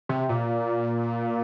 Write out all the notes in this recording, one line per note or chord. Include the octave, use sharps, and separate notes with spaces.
C3
A#2